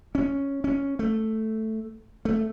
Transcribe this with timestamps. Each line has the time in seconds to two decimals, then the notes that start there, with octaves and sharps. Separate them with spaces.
0.15 C#4
0.64 C#4
0.99 A3
2.25 A3